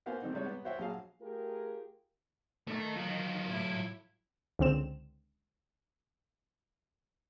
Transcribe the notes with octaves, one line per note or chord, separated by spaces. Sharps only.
A#3 B3 F#4 C5 F5 G#5
D#3 G3 A3 C4 D#4
C3 G3 G#3 C#5
B3
F#4 C5 C#5 E5 F#5 G5
A#1 F#3 F#4 G#4 F5
A3 F4 G4 G#4 A#4
D#3 A3
F#3 F4
A2 E4
C#2 D3 C4 E7